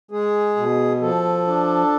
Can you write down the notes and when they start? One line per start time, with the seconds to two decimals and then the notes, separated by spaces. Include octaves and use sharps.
0.11 G#3 G#4
0.56 B2
1.01 F3 A4
1.47 D4